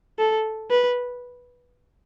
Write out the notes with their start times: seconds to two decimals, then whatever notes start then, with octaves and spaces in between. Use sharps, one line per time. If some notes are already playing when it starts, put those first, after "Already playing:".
0.19 A4
0.71 B4